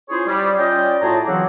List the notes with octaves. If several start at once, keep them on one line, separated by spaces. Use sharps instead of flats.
C#4 E4 F4 G#4 C5 C#5
G3
C#4 F4 D5 D#5 G5
A2 F4 F#4 G#4 A5 A#5
C#3 E3 F#3 C4 F#5 D6